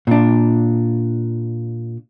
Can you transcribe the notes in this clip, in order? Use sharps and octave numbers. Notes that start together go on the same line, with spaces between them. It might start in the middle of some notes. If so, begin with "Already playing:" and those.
A#2 D4